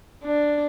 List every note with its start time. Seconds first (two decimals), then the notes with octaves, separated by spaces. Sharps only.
0.24 D4